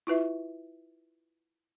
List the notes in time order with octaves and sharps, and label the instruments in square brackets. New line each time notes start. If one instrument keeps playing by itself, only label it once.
[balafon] E4 F4 B4 E5